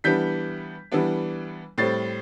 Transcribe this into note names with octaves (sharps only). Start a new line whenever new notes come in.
E3 G3 B3 D4 G6 B6
E3 G3 B3 D4
A2 G3 C4 A6 C7